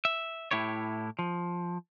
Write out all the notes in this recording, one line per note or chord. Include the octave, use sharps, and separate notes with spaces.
E5
A2 E4 G4 C#5
F3